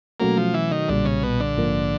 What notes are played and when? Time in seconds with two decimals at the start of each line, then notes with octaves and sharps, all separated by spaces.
0.20 B2 F#3 A3 A#3 C#4 F#4
0.37 F3
0.54 E3
0.71 D#3
0.89 B1 A#2 D3 G3
1.05 C#3
1.23 B2
1.40 D3
1.57 A#1 G#2 F3 A#3